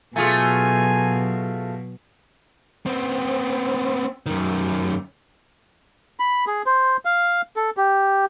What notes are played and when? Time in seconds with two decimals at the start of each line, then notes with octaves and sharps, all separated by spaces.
0.16 B2 F#3 A3 F4 G#4 G#5
2.86 B3 C4
4.26 F#2 D#3
6.20 B5
6.47 G#4
6.66 C5
7.05 F5
7.56 A4
7.77 G4